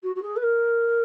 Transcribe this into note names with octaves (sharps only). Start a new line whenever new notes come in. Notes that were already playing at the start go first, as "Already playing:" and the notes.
F#4
F#4
G#4
B4
A#4